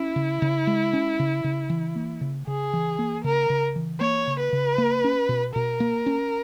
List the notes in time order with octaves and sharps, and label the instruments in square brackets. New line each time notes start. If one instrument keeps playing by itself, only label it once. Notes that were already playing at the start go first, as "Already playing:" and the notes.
Already playing: [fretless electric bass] C#4 [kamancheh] E4
[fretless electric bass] C#3
C#3
G#3
C#4
C#3
C#3
E3
A#3
C#3
[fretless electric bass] C#3 [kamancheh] G#4
[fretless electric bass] E3
A#3
[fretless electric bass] C#3 [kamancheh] A#4
[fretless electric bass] C#3
E3
[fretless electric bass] A#3 [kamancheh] C#5
[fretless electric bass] C#3
[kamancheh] B4
[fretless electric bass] C#3
A#3
C#4
B2
[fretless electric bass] B2 [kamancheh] A#4
[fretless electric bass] A#3
C#4